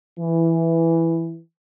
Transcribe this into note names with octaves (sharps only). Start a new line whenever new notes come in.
E3